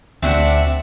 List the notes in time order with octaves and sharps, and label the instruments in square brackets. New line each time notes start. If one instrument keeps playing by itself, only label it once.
[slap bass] D2 [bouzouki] C4 D4 F#4 [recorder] E5